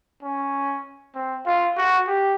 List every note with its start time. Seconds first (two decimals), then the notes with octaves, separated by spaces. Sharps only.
0.22 C#4
1.14 C4
1.46 F4
1.77 F#4
2.07 G4